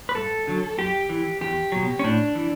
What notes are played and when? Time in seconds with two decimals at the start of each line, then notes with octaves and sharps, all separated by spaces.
0.09 B4
0.15 G2 A4
0.47 D3 F#3
0.78 F#2 G4
1.09 E3
1.41 E2 G4
1.72 B2 F#3
1.99 C#4
2.04 A2 D4
2.35 E3